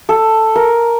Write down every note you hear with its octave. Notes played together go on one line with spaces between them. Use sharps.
A4
A#4